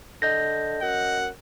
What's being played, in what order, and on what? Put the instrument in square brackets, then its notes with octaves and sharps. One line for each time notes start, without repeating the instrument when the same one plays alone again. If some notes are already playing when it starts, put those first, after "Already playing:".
[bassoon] D3 [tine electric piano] D#5 G6 A#6
[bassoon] F#2 [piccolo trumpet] F#5